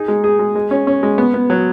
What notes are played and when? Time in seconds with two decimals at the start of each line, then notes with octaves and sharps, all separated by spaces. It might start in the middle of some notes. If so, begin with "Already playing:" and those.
Already playing: D#4 G#4
0.08 G#3
0.24 G#4
0.39 G#3
0.55 G#3
0.71 C#4
0.87 C#4
1.03 G#3
1.18 B3
1.34 B3
1.50 F#3